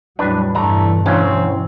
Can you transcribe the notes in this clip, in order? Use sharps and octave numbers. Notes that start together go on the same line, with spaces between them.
E2 A2 F#3 G3 D4 B4
G2 B2 E3 A3 D4 F#5 A#5
D2 C4 C#4 F5 A#5 C6